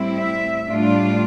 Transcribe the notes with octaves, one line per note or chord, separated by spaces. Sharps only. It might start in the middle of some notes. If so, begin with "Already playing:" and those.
Already playing: A2 G3 C4 E4
E5
A2 G3 D4 F4